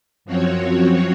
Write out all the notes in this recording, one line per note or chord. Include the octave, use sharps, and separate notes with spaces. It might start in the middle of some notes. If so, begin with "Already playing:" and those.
F#2 F3 C4 F#4 C#5